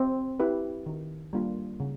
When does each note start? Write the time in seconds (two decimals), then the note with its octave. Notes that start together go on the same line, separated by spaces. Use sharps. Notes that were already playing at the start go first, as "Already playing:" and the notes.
Already playing: C4
0.40 E4 G4 B4
0.86 D#3
1.33 G3 A#3 D4 F4
1.80 C#3